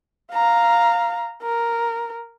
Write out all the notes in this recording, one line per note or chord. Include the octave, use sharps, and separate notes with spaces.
F5 A#5
A#4